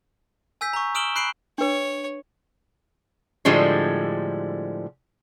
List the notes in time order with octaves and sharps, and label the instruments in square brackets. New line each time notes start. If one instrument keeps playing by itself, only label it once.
[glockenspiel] G#5 E6 G6 B6
A#5 C#6
D#6 F6 D7 E7 F#7 G7
B5 F#6 C7 D7 F#7
[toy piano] D4 B4 [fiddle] C#5
[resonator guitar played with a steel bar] A2 D3 F3 G3 G#3